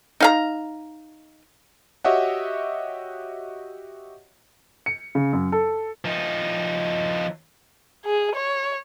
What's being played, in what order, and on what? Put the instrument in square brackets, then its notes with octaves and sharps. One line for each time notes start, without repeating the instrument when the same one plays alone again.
[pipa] D#4 F5 A#5
[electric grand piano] F#4 G4 C#5 D#5 E5 F#5
[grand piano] C#7
C#3
F#2
A4
[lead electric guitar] F3 D#4
[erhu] G#4
C#5